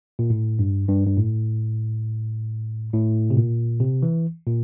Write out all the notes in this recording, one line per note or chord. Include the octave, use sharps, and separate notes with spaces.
A#2
A2
G2
G2
G2
A2
A2
C3
A#2
C3
E3
A#2